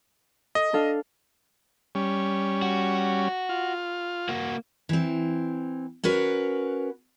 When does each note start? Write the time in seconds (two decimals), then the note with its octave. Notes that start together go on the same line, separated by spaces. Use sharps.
0.55 A4 D#5
0.73 D4 A4 F5
1.95 G3 C#4
2.62 F#4
3.49 F4
4.29 A#3 F#4
4.89 E3 C4
6.04 C#4 F#4 A#4 B4